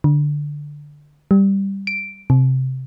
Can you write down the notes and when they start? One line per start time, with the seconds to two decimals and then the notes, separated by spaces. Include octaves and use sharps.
0.04 D3
1.31 G3
1.87 D7
2.30 C3